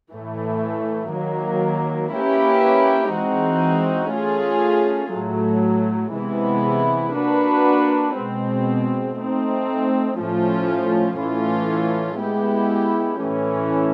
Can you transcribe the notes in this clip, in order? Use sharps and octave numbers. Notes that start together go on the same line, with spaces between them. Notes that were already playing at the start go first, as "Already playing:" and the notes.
A2 E3 A3
D#3 F#3 A#3
A#3 C#4 E4 G4 B4
E3 G#3 C4 D#4 F#4
A3 C#4 F4 G#4
A2 F#3 A3
C3 E3 G#3 B3 E4
A#3 D4 F#4 B4
B2 G#3 C4
A3 C4 D#4
A2 F3 A3 C#4 F4
A2 E3 A3 C#4 F4
G#3 B3 E4 G4
A2 E3 A3 C#4